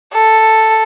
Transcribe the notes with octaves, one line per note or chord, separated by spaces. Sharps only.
A4